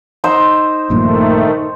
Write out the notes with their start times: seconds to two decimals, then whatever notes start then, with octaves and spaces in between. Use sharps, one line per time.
0.24 D#4 C5 E6
0.90 A#1 G2 A#2 D#3 A3